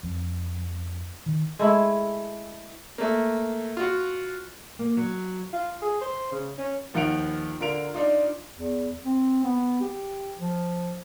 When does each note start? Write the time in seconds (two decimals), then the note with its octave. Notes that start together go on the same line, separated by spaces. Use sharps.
0.03 F2
1.26 D#3
1.59 G#3 A3 E4
2.98 A3 A#3
3.77 F4 F#4
4.79 A#3
4.97 F#3
5.53 F4
5.82 G#4
6.01 C5
6.32 C#3
6.58 C#4
6.94 D#2 F3 D#4 F#5 D7 F7
7.60 D3 F4 A#4 D7 F7
7.94 D4 D#4 F4
8.56 E2
9.05 C4
9.44 B3
9.81 G4
10.40 F3